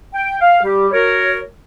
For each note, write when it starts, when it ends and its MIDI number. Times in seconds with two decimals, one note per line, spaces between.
0.14 0.40 79
0.40 0.60 77
0.63 0.87 55
0.63 0.87 67
0.92 1.41 66
0.92 1.41 70
0.92 1.41 73